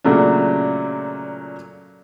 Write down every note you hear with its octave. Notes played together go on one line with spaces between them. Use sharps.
A#2 C#3 F#3 A3 D4